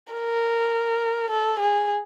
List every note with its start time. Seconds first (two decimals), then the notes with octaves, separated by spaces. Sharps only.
0.14 A#4
1.31 A4
1.60 G#4